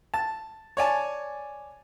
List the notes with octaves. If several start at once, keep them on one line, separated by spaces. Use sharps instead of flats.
A5
C#5 D5 G#5 A5